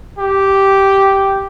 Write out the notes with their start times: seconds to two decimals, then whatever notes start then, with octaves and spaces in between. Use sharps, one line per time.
0.19 G4